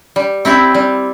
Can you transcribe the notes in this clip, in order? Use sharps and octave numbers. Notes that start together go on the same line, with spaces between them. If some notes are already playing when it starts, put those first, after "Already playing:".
G3
C4 E4 G4
G3